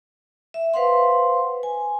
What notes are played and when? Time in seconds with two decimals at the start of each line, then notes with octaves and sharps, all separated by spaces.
0.54 E5
0.74 B4 C5 F5 F#5 C6
1.63 G#5